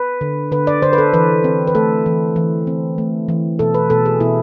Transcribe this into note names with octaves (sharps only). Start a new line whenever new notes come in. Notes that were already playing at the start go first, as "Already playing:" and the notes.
Already playing: B4
D3
D3 B4
D5
D3 C5
B4
A4
E3 B4
C4
B4
A3 A4
E3
E3
C4
A3
E3
B2 A4
B4
B2 A4
G#4
B2 E4